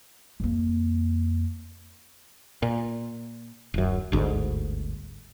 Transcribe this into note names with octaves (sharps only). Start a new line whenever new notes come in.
F2 A#3
A#2
D1 F#2
G1 D2 G#2